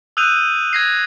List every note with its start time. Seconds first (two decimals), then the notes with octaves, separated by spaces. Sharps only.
0.17 D#6 E6 F#6 G6 D#7 F7
0.73 G#6 A#6 C7